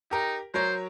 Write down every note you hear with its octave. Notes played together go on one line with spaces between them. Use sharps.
D#4 G4 A#4
F#3 A#4 C5 C#5